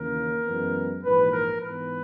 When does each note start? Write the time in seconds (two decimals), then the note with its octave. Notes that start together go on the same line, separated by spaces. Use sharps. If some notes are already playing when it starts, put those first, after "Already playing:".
Already playing: D#2 C#3 E3 A#3 C#4 A#4
0.46 F#2 E3 G#3 B3
1.04 A#1 G#2 E3 B4
1.33 A#4
1.62 G#2 E3 B3 B4